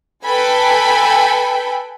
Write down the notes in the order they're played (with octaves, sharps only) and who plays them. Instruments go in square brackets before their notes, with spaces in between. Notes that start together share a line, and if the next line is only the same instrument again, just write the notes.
[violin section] A4 B4 G5 G#5 B5